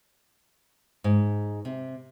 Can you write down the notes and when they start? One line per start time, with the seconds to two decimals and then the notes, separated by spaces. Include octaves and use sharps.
1.04 G#2
1.65 C3